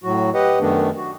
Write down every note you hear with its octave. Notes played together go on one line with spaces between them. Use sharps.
A2 F#3 F#4
G4 B4 D#5 F#5
F#2 D#3 A3 B3 D4
F#4